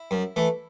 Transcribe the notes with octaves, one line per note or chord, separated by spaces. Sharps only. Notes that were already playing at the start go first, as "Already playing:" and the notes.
Already playing: E4
F#2
E3 A3